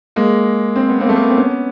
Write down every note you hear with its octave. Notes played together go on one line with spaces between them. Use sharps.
G#3 A#3
C4
B3
A#3 C4
A3
A#3
B3
C4
B3 C#4